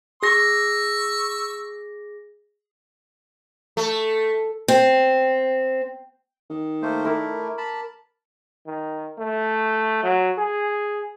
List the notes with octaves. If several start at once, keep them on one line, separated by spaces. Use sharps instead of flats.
G#4 C#6 E6 A#6
A3
C4
D#3
A3 A#3 C5
A3 E4 A#4 D6
A5 B5
D#3
A3
F#3
G#4